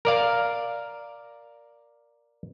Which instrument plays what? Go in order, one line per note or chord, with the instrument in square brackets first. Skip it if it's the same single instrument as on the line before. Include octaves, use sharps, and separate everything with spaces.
[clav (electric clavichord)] A#4 D5 F5